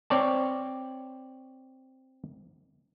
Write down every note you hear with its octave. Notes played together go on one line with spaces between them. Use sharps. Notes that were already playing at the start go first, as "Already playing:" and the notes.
C4 C#5 D5 A5